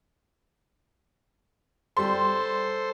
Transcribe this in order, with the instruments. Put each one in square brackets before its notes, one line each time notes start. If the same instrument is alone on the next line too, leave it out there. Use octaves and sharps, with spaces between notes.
[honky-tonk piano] G3 C6 [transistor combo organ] A4 C5